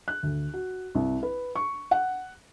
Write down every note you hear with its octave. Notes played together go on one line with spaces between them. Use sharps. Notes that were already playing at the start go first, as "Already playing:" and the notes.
F#6
D2
F#4
C2
B4
C#6
F#5